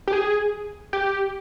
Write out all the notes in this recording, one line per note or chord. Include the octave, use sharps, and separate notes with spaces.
G4
G#4
G4